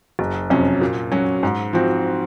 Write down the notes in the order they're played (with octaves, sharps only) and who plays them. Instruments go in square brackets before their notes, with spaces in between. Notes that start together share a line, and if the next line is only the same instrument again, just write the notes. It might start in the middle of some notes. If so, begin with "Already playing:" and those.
[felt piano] F#1
F2 C3 F#3 C#4
A#2
F#3 C#4 F#4
G#2
F3 C4 F#4